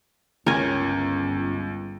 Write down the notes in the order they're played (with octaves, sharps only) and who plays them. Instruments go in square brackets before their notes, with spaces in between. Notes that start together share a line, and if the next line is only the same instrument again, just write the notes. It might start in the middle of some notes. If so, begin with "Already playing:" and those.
[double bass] G1 [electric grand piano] C#2 [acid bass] C#4 [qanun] A#4 G#5